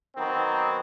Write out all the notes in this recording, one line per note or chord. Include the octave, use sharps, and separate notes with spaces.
D#3 F#3 B3 C4